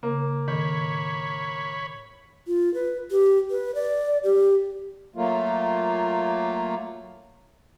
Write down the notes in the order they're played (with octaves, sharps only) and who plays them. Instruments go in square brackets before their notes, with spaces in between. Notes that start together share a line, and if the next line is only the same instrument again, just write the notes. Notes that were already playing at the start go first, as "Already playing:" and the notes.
[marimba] C#3 [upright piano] A#3
[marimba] A2 D#3 [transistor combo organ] C#5 B5
[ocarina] F4
B4
G4
B4
D5
G4
[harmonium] F#3 A3 A#3 F4